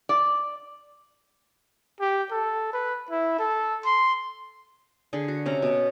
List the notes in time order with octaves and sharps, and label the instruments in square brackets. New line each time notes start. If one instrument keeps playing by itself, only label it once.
[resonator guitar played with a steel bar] D5
[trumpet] G4
A4
B4
E4
A4
C6
[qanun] D3 G#4
F#4
C3 C#4 A#5
B2